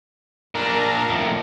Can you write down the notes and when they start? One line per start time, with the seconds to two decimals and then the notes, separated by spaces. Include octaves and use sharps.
0.55 A#2 D4 A#4 A#5
1.10 F2 A2